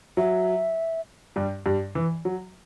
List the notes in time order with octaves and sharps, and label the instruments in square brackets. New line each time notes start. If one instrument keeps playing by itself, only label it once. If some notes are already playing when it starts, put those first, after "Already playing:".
[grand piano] F#3 [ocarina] E5
[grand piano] G2 G3
G2 G3
E3
F#3